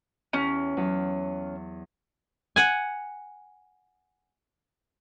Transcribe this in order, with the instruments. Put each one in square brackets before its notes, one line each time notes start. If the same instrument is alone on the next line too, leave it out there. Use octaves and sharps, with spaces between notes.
[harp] E2 G4 [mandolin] C#4
[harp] E2 F#3
[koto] F#5 G#5